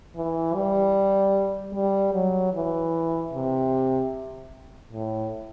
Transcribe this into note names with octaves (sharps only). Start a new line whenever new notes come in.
E3
G3
G3
F#3
E3
C3
A2